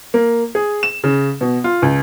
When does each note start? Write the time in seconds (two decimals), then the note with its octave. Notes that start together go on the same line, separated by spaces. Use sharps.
0.14 A#3
0.55 G#4
0.83 E7
1.04 C#3
1.41 B2
1.64 F4
1.82 C#2